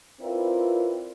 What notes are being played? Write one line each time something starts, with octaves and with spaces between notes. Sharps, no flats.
C4 E4 F4 A#4 B4 D5